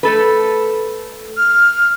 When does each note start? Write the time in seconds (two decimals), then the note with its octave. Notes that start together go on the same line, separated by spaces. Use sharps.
0.03 A3 A4 B4
1.37 F6